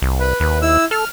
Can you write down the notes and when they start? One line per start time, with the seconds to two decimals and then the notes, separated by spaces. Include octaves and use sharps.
0.02 C2
0.20 B4
0.40 D#2 B4
0.62 E4 E6
0.91 A4 F6